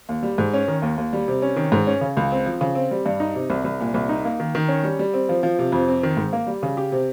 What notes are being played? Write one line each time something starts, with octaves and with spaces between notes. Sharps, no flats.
D#2
G3
G#2
C#4
D#3
D#2
D#2
G3
C3
C#4
D#3
G#2
C#4
C#3
C#2
C4
F3
C#3
C4
G3
G2
D#4
C3
C2
C2
A#2
C2
D#4
A#3
D#3
D#3
C#4
G3
G3
C4
F3
F3
C3
F2
C4
D#3
G#2
A#3
G3
C#3
G4
C3